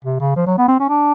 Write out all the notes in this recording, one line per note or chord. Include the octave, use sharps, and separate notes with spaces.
C3
C#3
F3
F#3
B3
C4
C#4
D4